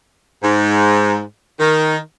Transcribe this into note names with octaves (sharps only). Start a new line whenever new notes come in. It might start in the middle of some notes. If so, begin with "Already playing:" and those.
G#2
D#3